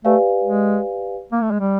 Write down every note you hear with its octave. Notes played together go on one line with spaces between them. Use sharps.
A3 G4 B4 D5 F5 G#5
G#3
A#3
A3
G#3
G3